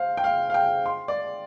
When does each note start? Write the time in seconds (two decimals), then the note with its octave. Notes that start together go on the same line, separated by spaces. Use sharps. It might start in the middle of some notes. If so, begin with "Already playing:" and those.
Already playing: C5 F5
0.17 G5
0.24 F5
0.50 F5
0.54 G5
0.86 C6
1.08 D5